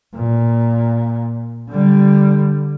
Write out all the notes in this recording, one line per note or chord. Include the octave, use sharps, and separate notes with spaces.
A#2
D3 G3